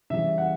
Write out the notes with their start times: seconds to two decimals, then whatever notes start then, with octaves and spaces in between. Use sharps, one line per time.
0.10 C#3 E3 G3 E5
0.38 F#5